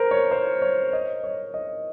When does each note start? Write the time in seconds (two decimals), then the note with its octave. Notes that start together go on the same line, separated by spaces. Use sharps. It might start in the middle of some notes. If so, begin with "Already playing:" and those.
Already playing: A#4 C5
0.11 C#5
0.31 C5
0.62 C#5
0.93 D#5
1.24 C#5
1.54 D#5